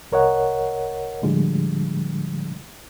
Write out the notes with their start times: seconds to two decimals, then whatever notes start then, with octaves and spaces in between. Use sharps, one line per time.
0.12 C2 A#4 C#5 D#5 F#5
1.23 A2 D3 F3 G3 G#3